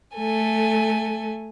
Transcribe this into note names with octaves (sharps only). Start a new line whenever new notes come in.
A3 A4 G#5